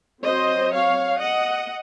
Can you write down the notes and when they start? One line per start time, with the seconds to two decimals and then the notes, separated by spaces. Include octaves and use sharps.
0.24 F#3 C4 C5 D#5
0.72 C#5 F5
1.20 D#5 F#5